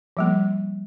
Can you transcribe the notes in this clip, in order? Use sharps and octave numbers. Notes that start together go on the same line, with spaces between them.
F3 G3 A#3